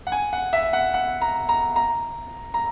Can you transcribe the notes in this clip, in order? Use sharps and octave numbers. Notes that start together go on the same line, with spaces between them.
F#5
G#5
F#5
E5
F#5
F#5
A#5
A#5
A#5
A#5